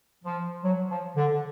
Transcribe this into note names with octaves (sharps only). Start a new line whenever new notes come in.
F3
F#3
F3
D3